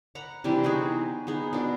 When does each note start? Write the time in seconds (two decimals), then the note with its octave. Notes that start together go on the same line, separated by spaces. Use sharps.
0.15 F#5 A#5 B5
0.44 C3 E3 G3 D4
0.64 B3 D#4 F#4 G#4
1.27 B3 D#4 G#4
1.53 B2 D4